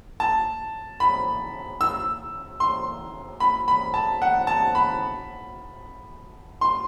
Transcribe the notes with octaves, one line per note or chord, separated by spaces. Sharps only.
A5
B5
E6
C6
B5
B5
A5
F#5
A5
B5
C6